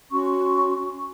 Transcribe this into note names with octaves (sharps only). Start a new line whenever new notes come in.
C#4 F#4 C6 C#6